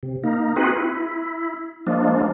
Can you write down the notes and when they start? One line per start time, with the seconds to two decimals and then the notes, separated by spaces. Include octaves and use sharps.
0.03 C3
0.24 A#3 D#4
0.56 C4 D#4 F4 F#4 G#4 B4
0.77 E4
1.87 F3 G#3 A#3 D4